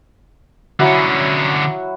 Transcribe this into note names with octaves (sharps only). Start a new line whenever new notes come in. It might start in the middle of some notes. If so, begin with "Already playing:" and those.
D3 F#3 C#4 E4 F#4